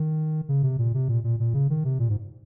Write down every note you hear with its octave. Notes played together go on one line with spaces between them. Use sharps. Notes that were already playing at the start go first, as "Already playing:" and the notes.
Already playing: D#3
C#3
C3
A#2
C3
A#2
A#2
A#2
C#3
D#3
C3
A#2
G#2